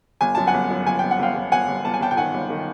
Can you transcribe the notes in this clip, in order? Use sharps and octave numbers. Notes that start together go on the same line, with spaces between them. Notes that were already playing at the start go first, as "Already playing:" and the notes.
G1 G#5
F#2 A5
F#5 G#5
G1
F#2
G1 G#5
G1 G5
F#5
G1 F5 G5
G1
G1 F#5 G#5
G1
G1 A5
G#5
G1 G5 A5
G5
D#3 F#5 G#5
G1
D#3